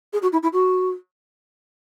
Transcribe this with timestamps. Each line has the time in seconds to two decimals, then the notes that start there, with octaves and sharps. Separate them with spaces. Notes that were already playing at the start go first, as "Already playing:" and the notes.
0.13 G#4
0.22 F#4
0.32 E4
0.42 E4
0.52 F#4